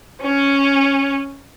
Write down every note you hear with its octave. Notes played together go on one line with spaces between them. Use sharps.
C#4